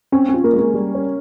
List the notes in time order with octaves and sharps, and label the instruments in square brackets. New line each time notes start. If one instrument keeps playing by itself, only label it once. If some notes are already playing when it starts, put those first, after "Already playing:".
[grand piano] C4 [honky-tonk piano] C#4
[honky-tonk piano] C#4 [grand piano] F4
[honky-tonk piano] A#3
[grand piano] G#3
[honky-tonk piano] A#3
[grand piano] G3
C#4